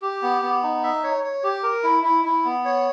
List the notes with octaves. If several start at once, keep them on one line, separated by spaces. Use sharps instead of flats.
G4
B3
B3
D#4
E5
C#5
C#5
G4
A#4
E4
E4
E4
B3
C#5